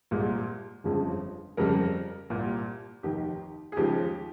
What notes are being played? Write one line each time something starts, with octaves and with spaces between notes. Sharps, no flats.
C2 A#2 G#3
G1 F2 C#3 F3 G#3
F2 C#3 G3 A#4
C2 A#2 G3
F1 D#2 D#3 G4
G#4
D#2 C#3 F3 G#3 G4